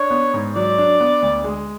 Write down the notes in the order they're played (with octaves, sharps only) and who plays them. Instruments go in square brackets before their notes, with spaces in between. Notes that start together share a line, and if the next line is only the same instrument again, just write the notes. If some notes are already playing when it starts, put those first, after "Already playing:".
Already playing: [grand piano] D4 [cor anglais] C#5
[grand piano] B3
G#2
[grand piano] F#3 [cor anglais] D5
[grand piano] D4
B3
D2
G#3